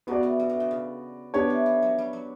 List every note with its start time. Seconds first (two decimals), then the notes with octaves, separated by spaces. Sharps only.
0.07 C#3 B3 F#4 B4 D5
0.23 A2
0.40 G2
0.49 A2
0.60 B2
0.71 C#3
1.34 D3 B3 D4 G4 C#5
1.50 E3
1.66 E3
1.82 F#3
1.98 G3
2.13 F#3